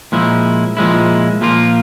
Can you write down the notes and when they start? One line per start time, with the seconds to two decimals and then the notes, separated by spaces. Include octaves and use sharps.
0.12 A#2 F3 G#3 E4
0.77 A#2 F3 G#3 E4
1.41 A#2 F3 A#3 F4